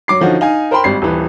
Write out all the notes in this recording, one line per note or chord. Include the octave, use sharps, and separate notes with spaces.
F#3 D6 C7
D3 F3 C#4 D#4 F#4
D#4 F5 G#5
A#4 C5 G5 B5 C6
G#1 G3 C7
D#1 E3 B4